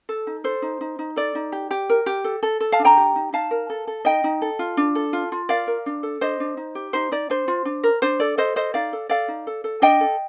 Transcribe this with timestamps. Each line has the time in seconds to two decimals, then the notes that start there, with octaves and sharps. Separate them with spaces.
0.09 A4
0.27 D#4
0.44 A4 C5
0.62 D#4
0.81 D#4
0.99 D#4
1.16 A4 D5
1.35 D#4
1.52 G4
1.71 G4
1.90 A#4
2.06 G4
2.24 A4
2.43 A4
2.60 A4
2.72 F5 A5
2.79 D4
2.85 G5 A#5
2.97 G4
3.16 D#4
3.33 D#4 F5 A5
3.51 A#4
3.70 A4
3.87 A4
4.05 D#4 D#5 G5
4.24 D#4
4.42 A4
4.59 F4
4.77 D4
4.95 A4
5.13 F4
5.32 F4
5.49 A#4 D5 F5
5.67 A#4
5.86 D4
6.03 A4
6.21 D4 C5 D#5
6.40 D4
6.57 D#4
6.75 G4
6.93 D#4 C5
7.11 D#4 D5
7.30 D4 C5
7.48 F4
7.65 D4
7.84 A#4
8.02 D4 C5
8.20 A4 D5
8.37 A4 C5 D#5
8.56 A4 C5 D#5
8.74 D#4 D5 F5
8.93 A4
9.09 A4 D5 F5
9.28 D#4
9.47 A4
9.64 A4
9.82 D4 D#5 G5
10.00 A4